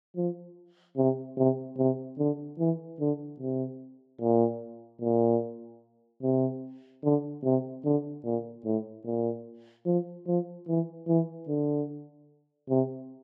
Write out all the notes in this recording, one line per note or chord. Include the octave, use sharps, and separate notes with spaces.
F3
C3
C3
C3
D3
E3
D3
C3
A#2
A#2
C3
D3
C3
D3
A#2
A2
A#2
F3
F3
E3
E3
D3
C3